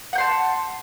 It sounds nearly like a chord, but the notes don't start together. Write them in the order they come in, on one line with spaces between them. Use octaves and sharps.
F#5 G6 C6 A5